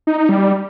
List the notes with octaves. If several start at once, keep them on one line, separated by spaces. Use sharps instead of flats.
D#4
D#4
G3